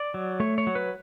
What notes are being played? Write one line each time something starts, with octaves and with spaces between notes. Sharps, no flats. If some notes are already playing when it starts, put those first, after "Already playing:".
Already playing: D5
F#3
A3 C#5
C#5
F#3
B4